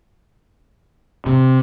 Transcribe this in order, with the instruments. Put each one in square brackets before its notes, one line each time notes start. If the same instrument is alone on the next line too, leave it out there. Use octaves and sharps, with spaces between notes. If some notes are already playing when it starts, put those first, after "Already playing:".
[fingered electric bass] C3